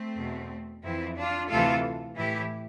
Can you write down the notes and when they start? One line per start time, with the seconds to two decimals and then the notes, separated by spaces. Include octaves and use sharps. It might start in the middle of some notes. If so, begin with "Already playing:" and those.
Already playing: A3 C4
0.17 E2 B2
0.83 F2 E3 C4 E4
1.16 D4 F4
1.50 D2 C3 E3 F4 A4
2.15 A2 E3 E4 G4